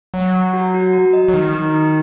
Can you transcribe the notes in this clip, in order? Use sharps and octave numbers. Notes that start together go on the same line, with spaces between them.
F#3 F#5
F#5
F#4
F#4
F#4
D#5
F#3
D#3 D#4
D#4
D#4